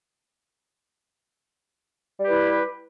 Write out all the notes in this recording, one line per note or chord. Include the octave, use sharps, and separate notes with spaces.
G3 E4 G4 B4